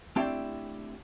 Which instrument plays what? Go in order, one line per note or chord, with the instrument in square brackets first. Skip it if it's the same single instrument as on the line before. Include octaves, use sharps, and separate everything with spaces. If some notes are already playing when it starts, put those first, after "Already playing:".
[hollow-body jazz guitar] A3 C4 D4 E4 G4 G5